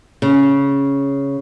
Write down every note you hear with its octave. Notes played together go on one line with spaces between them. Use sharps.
C#3